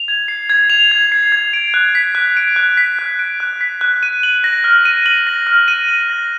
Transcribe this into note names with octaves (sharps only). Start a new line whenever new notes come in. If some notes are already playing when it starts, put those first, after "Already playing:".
Already playing: F7
G#6
C7
G#6
F7
G#6
C7
G#6
D7
F#6
B6
F#6
D7
F#6
B6
F#6
D7
F#6
B6
F#6
D#7
F#7
A#6
F6
D#7
F#7
A#6
F6
D#7
F#7
A#6